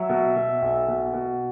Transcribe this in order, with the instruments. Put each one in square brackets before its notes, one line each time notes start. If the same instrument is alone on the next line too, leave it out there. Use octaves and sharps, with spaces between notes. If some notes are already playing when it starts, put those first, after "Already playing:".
Already playing: [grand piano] F#3 [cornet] E5
[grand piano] B2
B2
B1
B2
B2